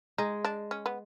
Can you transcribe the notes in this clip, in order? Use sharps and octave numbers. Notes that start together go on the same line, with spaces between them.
G#3 D#4
D4
C#4
B3